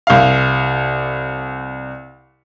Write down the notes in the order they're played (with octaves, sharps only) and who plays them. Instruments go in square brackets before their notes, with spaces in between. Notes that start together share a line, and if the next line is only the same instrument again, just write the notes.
[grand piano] C2 F5